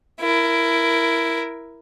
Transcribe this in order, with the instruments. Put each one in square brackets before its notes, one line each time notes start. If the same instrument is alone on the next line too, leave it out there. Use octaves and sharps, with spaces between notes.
[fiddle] E4 A#4